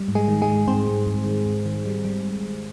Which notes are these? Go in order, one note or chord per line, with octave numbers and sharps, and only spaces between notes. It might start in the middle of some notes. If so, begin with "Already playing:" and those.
Already playing: G3
G#2
G#3 G#4
D#3
G#3 G#4
G#2
G#2 C4 C5
G#2
G#2
D#3
G#2
D#3
G3
G3